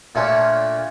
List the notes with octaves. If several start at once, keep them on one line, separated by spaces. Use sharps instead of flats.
A#2 A3 C#4 D4 F4 C#5